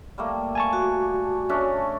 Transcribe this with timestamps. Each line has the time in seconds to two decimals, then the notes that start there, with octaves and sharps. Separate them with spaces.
0.18 G3 A3 A#3
0.55 G#5 A5 C#6
0.73 F#4
1.49 A3 C#4 D4